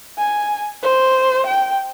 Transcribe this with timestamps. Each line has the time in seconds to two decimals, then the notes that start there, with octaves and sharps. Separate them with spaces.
0.19 G#5
0.83 C5
1.47 G5